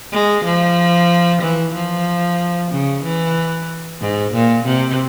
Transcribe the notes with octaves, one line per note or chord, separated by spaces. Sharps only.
G#3
F3
E3
F3
C#3
E3
G#2
A#2
C3